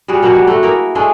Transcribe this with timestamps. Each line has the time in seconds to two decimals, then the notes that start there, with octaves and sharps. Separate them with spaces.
0.08 G3 F4 F#4 G#4
0.23 B2 F#3 A#3 F#4
0.35 G3
0.47 A3 F#4
0.63 A#3 E4 G#4 A#4
0.95 G#3 A3 D4 G#4